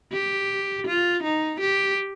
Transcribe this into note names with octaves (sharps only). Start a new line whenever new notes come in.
G4
F4
D#4
G4